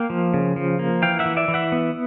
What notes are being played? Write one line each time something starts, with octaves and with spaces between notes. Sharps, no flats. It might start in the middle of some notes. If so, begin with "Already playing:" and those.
Already playing: A#3 F5 G5
F3
C#3
F3
A#3
E3 F5 G5
E5 F#5
E3
D5 E5
E3
E5 F#5
B3